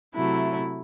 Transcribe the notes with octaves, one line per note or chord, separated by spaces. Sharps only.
C3 F#3 A3 E4